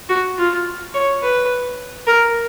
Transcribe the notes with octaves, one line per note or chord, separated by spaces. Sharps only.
F#4
F4
C#5
B4
A#4